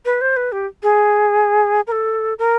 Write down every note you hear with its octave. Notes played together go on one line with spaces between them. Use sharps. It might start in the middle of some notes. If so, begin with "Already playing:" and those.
B4
C5
B4
G4
G#4
A#4
A4
A#4